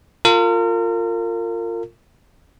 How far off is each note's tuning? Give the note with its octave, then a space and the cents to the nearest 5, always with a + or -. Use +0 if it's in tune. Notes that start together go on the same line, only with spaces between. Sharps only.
F4 +0 A#4 -35